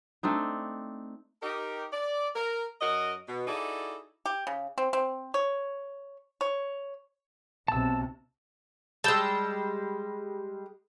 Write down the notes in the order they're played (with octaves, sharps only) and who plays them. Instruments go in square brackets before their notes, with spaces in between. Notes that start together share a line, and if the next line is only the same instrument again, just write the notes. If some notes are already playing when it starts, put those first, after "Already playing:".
[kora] A3 C4 D4 D#4
[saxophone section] D#4 G4 A#4
D5
A#4
F#2 F#4 A#4 D#5
B2
D#4 E4 F#4 G#4 A4 D5
[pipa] G4
C#3
C4
C4
C#5
C#5
[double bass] B1 C3 [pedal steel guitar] A5 E6
[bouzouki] G3 G#3 [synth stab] A5 E6 G6